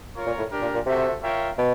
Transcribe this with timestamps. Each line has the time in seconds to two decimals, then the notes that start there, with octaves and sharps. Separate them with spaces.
0.15 F4 A#4 C#5
0.27 A#2
0.38 A2
0.51 D4 G4 A#4
0.62 A#2
0.75 A#2
0.86 C3 F#4 A4 C5 E5
1.22 F4 A#4 C#5 E5 G5
1.58 B2